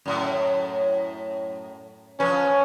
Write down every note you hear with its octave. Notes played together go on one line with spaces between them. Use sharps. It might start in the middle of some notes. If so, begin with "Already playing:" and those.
F#2 A2
F3 C#4 B4